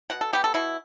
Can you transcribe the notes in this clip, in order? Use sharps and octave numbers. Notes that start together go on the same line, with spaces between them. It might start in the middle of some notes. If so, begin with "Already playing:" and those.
B2 F#5
A4
G3 B3 G4
A4
B2 E4